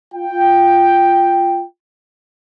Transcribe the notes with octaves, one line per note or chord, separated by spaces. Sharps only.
F4 G5